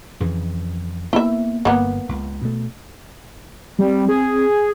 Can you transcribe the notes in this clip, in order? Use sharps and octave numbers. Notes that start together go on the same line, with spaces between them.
F2 C#3 E3
A#3 B3 E4 E5
G1 A#3 B3
C#2
B2 A3
G3 C4
G#4